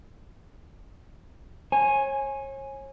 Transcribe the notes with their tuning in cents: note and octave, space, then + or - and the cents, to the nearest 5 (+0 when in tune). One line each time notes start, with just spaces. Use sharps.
C#5 -35 G#5 +0